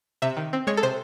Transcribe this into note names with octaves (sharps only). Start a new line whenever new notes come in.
C3 E5
D#3
C4
G#3 C#5
A4
C3 C5